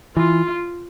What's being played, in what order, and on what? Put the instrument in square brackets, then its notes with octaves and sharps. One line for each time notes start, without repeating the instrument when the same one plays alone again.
[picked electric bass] E3 [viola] F4